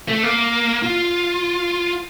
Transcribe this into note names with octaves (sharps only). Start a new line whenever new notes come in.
A3
A#3
F4